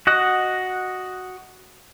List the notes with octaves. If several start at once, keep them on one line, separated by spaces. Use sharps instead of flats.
F#4 D#5 F#5